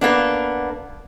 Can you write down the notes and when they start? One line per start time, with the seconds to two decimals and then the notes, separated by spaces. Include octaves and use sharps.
0.01 A#3 B3 D4